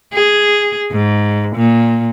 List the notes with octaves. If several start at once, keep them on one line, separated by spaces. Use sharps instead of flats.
G#4
G#2
A#2